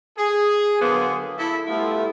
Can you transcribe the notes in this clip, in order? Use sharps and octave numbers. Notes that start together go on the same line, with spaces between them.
G#4
D3 F#3 A#3 B3 G#4 C5
E4 A4
G3 A3 B3 E4 F4